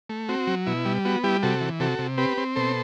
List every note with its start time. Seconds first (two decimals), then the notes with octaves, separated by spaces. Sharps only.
0.09 A3
0.29 C4 F#4
0.47 F#3
0.67 B2 E4
0.85 G3
1.05 B3 F#4
1.24 G3 E4 G4
1.43 C3 F#4 A4
1.61 E3
1.80 C3 F#4 A4
1.99 C3
2.18 C4 G4 B4
2.37 C4
2.56 B2 A4 C5